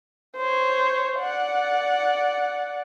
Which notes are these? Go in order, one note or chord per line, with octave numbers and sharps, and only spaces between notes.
C5 C#5
D5 F#5